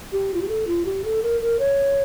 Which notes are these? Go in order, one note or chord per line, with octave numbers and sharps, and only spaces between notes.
G4
F4
G4
A4
F4
G4
A4
A#4
A#4
C#5